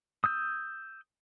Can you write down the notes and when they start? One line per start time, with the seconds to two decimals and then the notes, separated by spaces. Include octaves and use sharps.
0.24 D#6 E6 G6